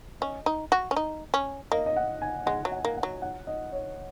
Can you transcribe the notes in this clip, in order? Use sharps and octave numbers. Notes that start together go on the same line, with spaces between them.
C#4 D#5
D#4
F#4
C#4
D#4
C#4
A#3 D#5
D#5
F#5
G#5
G#3 F#5
F#3
F#5
A#3
F#5
F#3
F#5
D#5
C#5